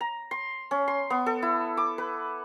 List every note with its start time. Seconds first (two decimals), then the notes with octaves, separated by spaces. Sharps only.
0.01 A#5
0.31 C6
0.71 C#4
0.88 C6
1.10 B3
1.26 A4
1.42 E4
1.77 D6
1.98 B4